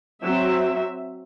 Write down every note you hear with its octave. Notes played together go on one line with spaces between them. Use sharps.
F#3 C4 E5